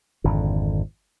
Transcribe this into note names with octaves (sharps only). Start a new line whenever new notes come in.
G#1 F2 D3